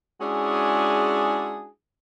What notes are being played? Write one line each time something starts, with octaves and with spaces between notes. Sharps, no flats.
G#3 C#4 D4 E4 F#4 G#4